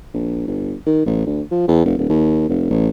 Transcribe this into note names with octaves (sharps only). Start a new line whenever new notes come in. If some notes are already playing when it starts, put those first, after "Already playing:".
A#1
G1
D#3
A1
D2
F3
E2
F1
D#1
D#2
F1
A1